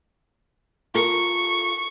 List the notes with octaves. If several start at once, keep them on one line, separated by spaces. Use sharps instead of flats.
F4 A4 A#4 C#6